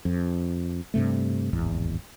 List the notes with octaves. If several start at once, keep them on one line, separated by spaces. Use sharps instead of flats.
F2
G2 C3 A3
D1 G#1 E2